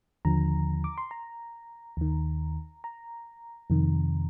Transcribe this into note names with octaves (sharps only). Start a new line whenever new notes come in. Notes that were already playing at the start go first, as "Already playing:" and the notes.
D#2 D3 F3 A#5
D6
C6
A#5
D#2 D#3
A#5
F2 C3 D#3